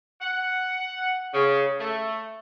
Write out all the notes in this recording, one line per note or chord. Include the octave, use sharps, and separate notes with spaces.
F#5
C#3
A3